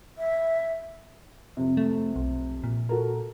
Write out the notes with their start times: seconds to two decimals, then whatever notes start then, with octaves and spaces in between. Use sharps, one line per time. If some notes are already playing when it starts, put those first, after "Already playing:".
0.18 E5
1.57 F2 C3
1.77 A3
2.16 B1
2.64 A#2
2.89 F#4 A4 A#4